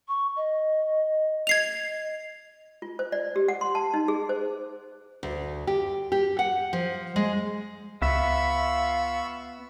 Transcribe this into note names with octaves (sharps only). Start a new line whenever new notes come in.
C#6
D#5
D#5 G#6 C7 F7
F4
C5
D5
G4
F#5
C6
A5
D#4
G#4
C5
D2
G4
G4
F#5
F3
G#3
C#2 B3 F4 E5 B5 C#6 E6